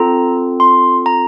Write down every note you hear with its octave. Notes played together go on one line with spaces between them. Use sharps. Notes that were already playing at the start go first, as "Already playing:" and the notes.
Already playing: C4 F4 A4 A#5
C6
A#5